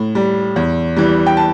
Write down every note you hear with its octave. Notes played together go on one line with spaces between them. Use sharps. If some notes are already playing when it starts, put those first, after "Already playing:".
Already playing: A2
G3
E2
E3 G3
G5
A5